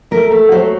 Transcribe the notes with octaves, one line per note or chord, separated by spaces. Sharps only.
A3 A#4
A3
F#3 C5